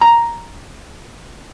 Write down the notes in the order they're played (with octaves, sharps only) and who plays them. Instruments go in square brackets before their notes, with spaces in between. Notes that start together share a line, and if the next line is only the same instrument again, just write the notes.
[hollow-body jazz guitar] A#5